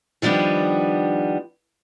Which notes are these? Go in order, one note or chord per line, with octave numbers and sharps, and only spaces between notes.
D#3 F3 G3 B3 D4